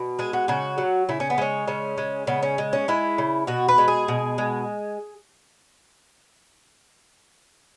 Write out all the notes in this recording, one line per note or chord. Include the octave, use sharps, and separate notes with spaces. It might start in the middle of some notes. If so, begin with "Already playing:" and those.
Already playing: B2
G#3 G#4
F#4
C#3 F#4
F#3
C#3 E4
C#4
B3
G#3 C#4
C#3 C#4
G#3
C#3 B3
C#4
G#3
C#4
G#3 E4
C#3
B2 F#4
B4
G#3
G#4
B2
G#3